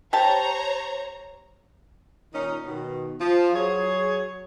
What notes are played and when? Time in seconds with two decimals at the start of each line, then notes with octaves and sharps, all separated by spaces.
0.13 G4 C5 C#5 A5 A#5
2.33 A#2 D#3 C#4 D#4
2.65 B2 D#3
3.20 F3
3.54 F#3 G#4 C#5